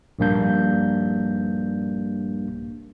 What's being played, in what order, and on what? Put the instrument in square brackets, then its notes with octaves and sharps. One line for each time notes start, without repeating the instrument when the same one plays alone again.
[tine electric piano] A#1 G2 G3 A#3 D4 G6